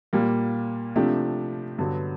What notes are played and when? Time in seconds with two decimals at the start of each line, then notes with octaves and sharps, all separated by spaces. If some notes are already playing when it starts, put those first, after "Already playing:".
0.13 A#2 G3 A#3
0.96 C3 F3 A3 D4 G4
1.78 G2 D3 F#3 B3